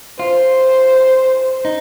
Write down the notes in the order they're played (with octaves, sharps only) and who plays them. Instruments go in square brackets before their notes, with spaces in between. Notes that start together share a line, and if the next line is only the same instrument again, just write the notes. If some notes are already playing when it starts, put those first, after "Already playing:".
[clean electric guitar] F4 [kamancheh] C5
[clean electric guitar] D#4